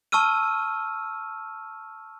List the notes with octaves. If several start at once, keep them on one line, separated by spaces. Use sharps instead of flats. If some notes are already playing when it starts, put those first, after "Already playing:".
A5 C#6 E6 F6 D#7